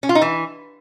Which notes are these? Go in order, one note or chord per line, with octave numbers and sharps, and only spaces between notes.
C#4
F4
D#4
E3